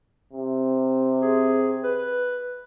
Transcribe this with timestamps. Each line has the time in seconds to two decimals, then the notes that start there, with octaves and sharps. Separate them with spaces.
0.33 C3
1.21 G#4
1.83 B4